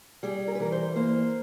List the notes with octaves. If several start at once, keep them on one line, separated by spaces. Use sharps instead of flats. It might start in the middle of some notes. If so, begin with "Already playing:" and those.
G3 G#4
A#4
B4
E3 A#4
C5
A#3 C5